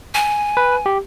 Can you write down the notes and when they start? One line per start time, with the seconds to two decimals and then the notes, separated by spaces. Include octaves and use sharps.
0.14 G#5
0.57 B4
0.86 G4